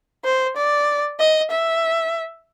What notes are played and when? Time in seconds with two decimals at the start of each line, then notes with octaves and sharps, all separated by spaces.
0.24 C5
0.57 D5
1.20 D#5
1.51 E5